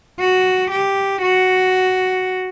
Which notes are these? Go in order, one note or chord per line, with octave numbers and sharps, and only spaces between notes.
F#4
G4
F#4